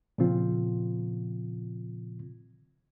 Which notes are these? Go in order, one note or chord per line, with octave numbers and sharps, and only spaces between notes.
A#2 C#3 F3 C4 F4